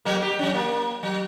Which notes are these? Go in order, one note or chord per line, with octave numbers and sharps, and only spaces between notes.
F2 F#3 A#3
G4
F#3 C#4
A#3
F#3